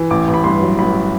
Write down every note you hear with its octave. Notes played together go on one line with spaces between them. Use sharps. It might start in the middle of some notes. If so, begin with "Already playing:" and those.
Already playing: E3
A1 D6
A1
B5
G2 C6
F#3
A1 B5